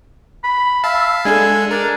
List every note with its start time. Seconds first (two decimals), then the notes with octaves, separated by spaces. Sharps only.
0.44 B5
0.84 E5 F5 A5
1.25 G#3 D4 A4 G#5
1.71 D4 A#4